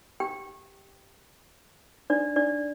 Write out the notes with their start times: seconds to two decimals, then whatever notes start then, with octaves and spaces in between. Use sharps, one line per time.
0.20 G4 G5
2.10 D4 D5
2.36 D4 D5